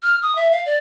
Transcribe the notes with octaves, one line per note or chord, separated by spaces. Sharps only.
F6
D#6
E5
F5
D5